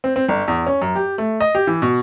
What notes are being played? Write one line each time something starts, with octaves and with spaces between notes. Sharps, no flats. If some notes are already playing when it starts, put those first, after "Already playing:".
C4
C4
G1
E2
C#4
F#2
G4
A3
D#5
G4
E3
B2